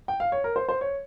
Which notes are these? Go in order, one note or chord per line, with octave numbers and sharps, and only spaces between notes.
G5
F5
C#5
A#4
C5
C5
C#5